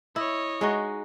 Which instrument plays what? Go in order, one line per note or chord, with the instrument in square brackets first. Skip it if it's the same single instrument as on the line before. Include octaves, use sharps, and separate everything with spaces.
[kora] E4 [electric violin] C#5 D#5
[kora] G#3 D#4 F#4